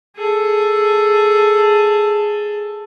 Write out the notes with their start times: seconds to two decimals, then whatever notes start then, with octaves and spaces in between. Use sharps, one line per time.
0.16 G#4 A4